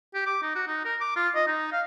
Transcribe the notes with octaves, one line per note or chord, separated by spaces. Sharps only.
G4
D6
D#4
F#4
D#4
A#4
D6
F4
D#5
D#4
F5